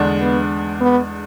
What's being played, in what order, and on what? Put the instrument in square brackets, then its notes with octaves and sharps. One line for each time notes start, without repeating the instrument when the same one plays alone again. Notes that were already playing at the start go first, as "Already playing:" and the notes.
Already playing: [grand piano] E2 D3 G#3 D4
[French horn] B3
B3